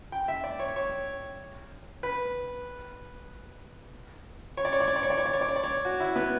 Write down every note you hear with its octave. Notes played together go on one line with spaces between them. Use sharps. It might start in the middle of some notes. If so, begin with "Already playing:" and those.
G5
E5
D5
C#5
C#5
B4
C#5
D5
C#5
D5
C#5
D5
C#5
D5
C#5
D5
C#5
D5
C#5
D5
C#5
F#4
E4
B3